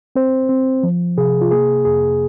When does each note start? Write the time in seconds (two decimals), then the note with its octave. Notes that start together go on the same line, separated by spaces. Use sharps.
0.16 C4 C5
0.49 C4
0.83 F3
1.17 C3 G#4
1.41 F4
1.51 A#3 G#4
1.85 F2 G#4